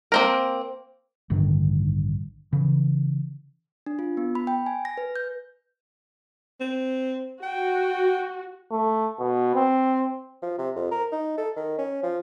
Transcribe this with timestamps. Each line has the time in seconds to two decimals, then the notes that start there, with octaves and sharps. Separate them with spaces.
0.12 A#3 C4 A#4
1.30 A1 G2 D3 D#3
2.53 C#3 E3
3.86 D4
3.99 F4
4.17 B3
4.35 B5
4.47 G5
4.66 G#5
4.85 A#6
4.97 B4
5.16 G6
6.60 C4
7.43 F#4 G5
8.71 A3
9.19 B2
9.55 C4
10.42 F3
10.58 C3
10.75 F2
10.91 A#4
11.12 D#4
11.37 A4
11.56 D#3
11.78 C#4
12.03 F3